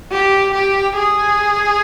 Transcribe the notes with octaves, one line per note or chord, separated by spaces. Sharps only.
G4
G4
G#4